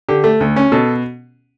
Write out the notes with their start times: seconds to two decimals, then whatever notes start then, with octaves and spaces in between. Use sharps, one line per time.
0.09 D3 G4
0.24 A3
0.40 D2
0.56 C#4
0.72 B2 A4